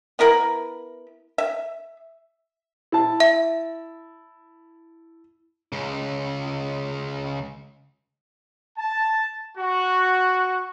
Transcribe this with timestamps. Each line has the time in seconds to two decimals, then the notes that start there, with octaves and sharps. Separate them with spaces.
0.19 B3 E4 A#4 B5
1.38 E5
2.92 E4 A5
3.20 E5
5.72 C#2 C#3
8.77 A5
9.58 F#4